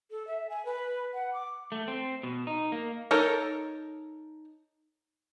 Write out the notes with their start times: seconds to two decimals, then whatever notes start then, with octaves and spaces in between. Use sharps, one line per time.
0.11 A4
0.27 E5
0.50 G#5
0.65 B4
1.14 F#5
1.33 D6
1.72 A3
1.88 C4
2.23 B2
2.47 D#4
2.72 A#3
3.11 D#4 A4 A#4 C#5